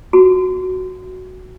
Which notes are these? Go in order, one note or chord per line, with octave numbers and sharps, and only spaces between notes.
F#4